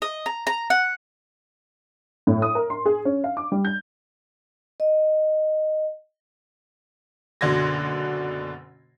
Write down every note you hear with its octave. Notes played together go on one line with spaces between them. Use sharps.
D#5
A#5
A#5
F#5
A2
D#6
A#4
C6
G#4
C#4
F5
D6
G3
G6
D#5
F#1 B2 D3 C6 G#6 A#6